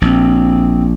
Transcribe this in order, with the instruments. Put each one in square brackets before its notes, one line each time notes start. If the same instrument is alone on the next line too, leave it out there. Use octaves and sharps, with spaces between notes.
[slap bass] A#1 [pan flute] C4